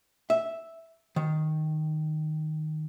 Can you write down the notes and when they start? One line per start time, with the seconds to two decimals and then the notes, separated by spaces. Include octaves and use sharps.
0.30 E5
1.16 D#3